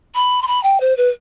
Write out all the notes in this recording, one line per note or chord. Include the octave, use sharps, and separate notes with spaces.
B5
C6
B5
G5
C5
B4